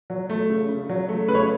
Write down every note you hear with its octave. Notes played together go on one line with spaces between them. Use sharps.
F#3
A3
C#3
C#3
F#3
A3
C#3 B4
C#5